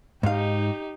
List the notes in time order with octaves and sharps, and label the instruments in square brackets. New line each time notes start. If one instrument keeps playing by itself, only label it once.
[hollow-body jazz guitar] G#2 F5 [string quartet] D#4 G4